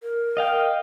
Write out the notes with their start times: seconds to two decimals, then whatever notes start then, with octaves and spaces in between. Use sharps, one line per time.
0.03 A#4
0.37 D#5 F5 G5